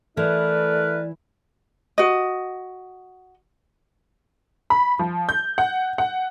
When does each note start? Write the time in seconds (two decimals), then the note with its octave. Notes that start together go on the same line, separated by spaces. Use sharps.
0.17 E3 A3 E4 A#4 B4 D5
1.98 F#4 D#5
4.70 B5
4.99 F3
5.29 G6
5.58 F#5
5.98 F#5